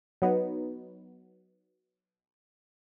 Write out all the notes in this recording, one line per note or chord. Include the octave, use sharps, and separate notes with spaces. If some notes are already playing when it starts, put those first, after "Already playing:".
F#3 B3 D#4